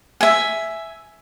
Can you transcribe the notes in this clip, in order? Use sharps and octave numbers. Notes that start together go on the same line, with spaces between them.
E5 G#5